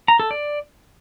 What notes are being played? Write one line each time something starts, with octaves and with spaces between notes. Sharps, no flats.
A#5
A4
D5